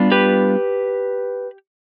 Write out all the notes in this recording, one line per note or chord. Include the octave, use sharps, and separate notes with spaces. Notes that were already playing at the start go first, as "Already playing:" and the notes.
Already playing: G3 B3 D4 F4
G4 B4